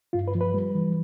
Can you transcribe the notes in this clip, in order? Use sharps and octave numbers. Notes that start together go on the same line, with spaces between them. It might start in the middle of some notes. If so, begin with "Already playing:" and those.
G2 F4
B4
F3
B4
G3
E3